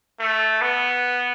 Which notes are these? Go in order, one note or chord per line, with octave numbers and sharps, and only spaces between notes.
A3
B3